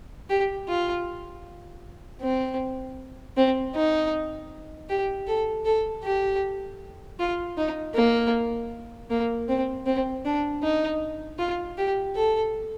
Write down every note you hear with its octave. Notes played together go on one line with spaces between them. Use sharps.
G4
F4
C4
C4
D#4
G4
A4
A4
G4
F4
D#4
A#3
A#3
C4
C4
D4
D#4
F4
G4
A4